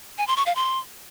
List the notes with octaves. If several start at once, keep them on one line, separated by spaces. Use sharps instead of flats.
G#5
C6
C#6
F5
C6